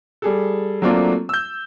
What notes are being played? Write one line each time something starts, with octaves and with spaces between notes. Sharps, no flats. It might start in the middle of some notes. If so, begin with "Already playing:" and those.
G3 G#4 A4
F#3 A3 A#3 C4 D4 F4
E6 G6